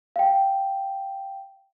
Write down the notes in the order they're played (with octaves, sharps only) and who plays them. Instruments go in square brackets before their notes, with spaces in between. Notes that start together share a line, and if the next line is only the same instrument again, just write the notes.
[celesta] F5 G5